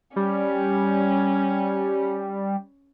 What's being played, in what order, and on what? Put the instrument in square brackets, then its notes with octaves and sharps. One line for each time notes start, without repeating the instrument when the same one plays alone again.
[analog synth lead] G3 [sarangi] C#4